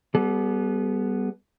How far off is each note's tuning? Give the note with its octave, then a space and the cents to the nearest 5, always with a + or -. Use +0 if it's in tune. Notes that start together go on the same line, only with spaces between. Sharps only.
G3 +0 B3 +0 A4 -40